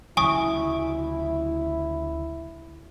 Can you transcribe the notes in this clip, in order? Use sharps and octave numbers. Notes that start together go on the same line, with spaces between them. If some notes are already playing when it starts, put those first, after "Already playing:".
D2 C#3 F#3 E4 G#5 C#6 D#6